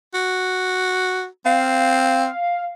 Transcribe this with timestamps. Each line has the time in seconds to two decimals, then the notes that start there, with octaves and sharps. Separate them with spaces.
0.14 F#4
1.46 C4 F5